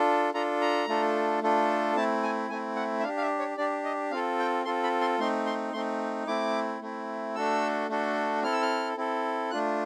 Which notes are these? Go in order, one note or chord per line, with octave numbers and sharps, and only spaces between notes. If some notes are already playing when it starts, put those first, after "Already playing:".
Already playing: D4 F4 A4
D4 F4 A4 A#5
A#5
A3 D4 F4 A4
A3 D4 F4 A4
A3 C4 E4 A5
G#5
A3 C4 E4 G#5
F#5
E5
D4 G4 F5
F5
E5
C#5
D4 G4 D5
D#5
C4 F4 A4 F5
G5
C4 F4 A4 C6
B5
C6
A3 C4 D#4 C6
C6
A3 C4 D#4 C6
A3 C4 E4 D6
A3 C4 E4
A3 D4 F#4 A4 E6
A3 D4 F#4 A4
C4 E4 A4 F6
E6
F6
C4 E4 A4
A3 D4 F4 F#6